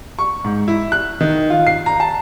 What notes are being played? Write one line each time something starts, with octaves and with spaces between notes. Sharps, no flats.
C#6
G#2
E4
F#6
D#3
F4
C7
A#5
A5